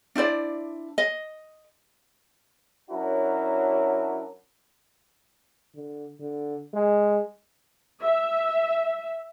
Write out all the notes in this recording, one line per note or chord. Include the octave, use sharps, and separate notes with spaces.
D4 E4 C5 D5
D#5
F#3 C#4 D4 E4 F#4 A#4
D3
D3
G#3
E5